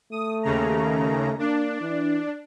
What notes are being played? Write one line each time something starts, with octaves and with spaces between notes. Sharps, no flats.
A3 D#6
D#2 C#3 A#5
A#3 D4
E3